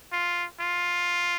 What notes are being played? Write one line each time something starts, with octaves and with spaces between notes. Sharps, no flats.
F4
F4